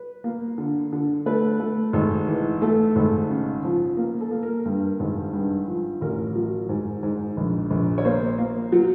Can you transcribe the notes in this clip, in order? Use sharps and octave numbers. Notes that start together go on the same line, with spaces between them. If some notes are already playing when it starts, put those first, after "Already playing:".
Already playing: B4
A#3
D3
D3
A3 B4
A3
G#1
E3
A3 A4
G#1
C#3
F3
A#3
A4
A#3
A#4
G2 A#4
G#1
G2
F3
A1 A#4
F#3
G#2
G#2
A#1
A#1
C#5
A#3 C5
A#3
F#3